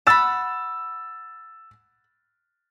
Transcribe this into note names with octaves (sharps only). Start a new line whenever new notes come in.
F#5 B5 E6 A6 E7